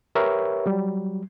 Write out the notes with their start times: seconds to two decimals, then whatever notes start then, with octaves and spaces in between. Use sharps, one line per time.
0.15 G4 A#4 B4 C#5 E5
0.66 F#3 G3